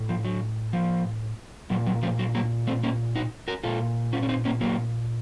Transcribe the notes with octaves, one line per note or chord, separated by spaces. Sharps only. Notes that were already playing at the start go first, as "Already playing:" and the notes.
Already playing: A2
F3
F#3
F3
A#2 F#3
F#3
F3 A3
F#3
F#3 A#3
A3 C4
A#3 C#4
D#4 F#4
F#4 A#4
A#2 F4 A4
C#4 F4
C#4
C4 D#4
A#3 C#4
F#3 A#3